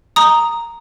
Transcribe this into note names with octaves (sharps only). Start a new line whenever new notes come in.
A#5 D#6